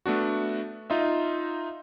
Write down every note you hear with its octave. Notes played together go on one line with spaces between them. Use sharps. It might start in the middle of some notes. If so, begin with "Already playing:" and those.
A3 B3 D4 F#4
D#4 F4 D#5 E5